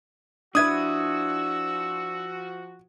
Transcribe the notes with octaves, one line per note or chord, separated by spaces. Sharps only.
F3 D4 E4 F#4 B4 D#6 E6 G#6